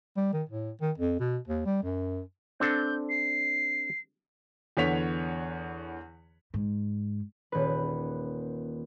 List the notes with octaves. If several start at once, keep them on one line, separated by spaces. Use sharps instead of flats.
G3
D#3
A2
D#3
F2
B2
D#2
G3
F#2
C4 D4 A4 G6
C7
E2 D3 B3 C#5 B6 F7
G#2
D#1 B4